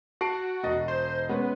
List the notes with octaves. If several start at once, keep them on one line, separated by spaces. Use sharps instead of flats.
F#4 A5 C7 D7
E1 D#5 A6
C5
C5
G#3 B3 C#4 B4